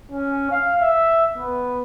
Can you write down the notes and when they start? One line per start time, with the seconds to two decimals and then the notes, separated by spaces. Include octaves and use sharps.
0.12 C#4
0.51 F5
0.81 E5
1.38 B3